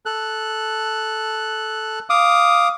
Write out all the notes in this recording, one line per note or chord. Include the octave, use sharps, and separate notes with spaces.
A4 F#6
F5 D6 D#6